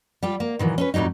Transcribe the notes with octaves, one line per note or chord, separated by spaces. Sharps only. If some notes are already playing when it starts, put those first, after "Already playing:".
G3 F4 G4
A#3
A#2 D#3 E3 F#3
C#4 A4 B4
F2 A2 F#3 G3 D#4